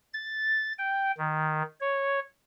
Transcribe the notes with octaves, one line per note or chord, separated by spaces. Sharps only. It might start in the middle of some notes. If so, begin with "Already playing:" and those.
A6
G5
D#3
C#5